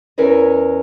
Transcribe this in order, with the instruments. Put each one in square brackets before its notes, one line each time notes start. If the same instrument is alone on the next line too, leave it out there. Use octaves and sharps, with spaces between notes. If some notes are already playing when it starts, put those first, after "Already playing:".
[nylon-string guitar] E2 C#4 A#4 B4 D#5